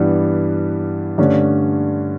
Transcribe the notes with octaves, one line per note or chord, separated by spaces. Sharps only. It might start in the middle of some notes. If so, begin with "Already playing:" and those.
Already playing: G2 E3 G3 B3
G2 D3 A3 C#4